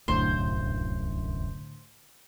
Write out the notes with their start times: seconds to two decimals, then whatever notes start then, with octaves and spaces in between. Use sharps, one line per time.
0.08 D1 C2 F#2 A2 D3 C5